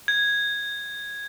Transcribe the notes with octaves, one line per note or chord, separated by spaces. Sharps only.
G#6